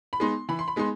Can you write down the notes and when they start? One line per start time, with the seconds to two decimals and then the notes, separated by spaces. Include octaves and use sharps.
0.13 B5
0.20 G#3 B3 D#4 C6
0.49 E3 B5
0.59 C6
0.68 B5
0.76 G#3 B3 D#4 C6